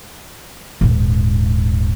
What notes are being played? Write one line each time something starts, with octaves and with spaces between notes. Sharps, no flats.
D#1 G#2